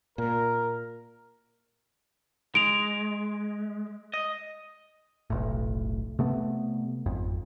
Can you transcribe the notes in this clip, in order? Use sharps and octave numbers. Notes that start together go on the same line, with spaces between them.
A#2 A#4
G#3 D7 F7
D#5
F1 B1 A2
C3 A3 B3
G#1 F2